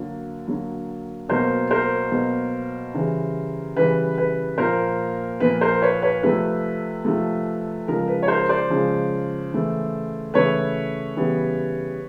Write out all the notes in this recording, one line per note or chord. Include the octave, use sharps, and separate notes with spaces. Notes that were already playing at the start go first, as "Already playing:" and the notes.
Already playing: D3 F#3 A#3
D3 F#3 A#3
B2 F#3 A#3 A#4 C5
A#4 C5
B2 F#3 A#3
C#3 E3 G3
C#3 E3 G3 B4
B4
A#2 F3 A#3 A#4 C5
A#2 F3 A#3 B4
A#4 C5
B4 C#5
B4 C#5
C3 F3 A3 B4
C3 F3 A3
C#3 F3 G#3 A#4
B4
C#5
A#4 C5
C5 D5
C#3 F3 G#3
C#3 E3 A3
C#3 E3 A3 B4 C#5
C#3 E3 G3 B3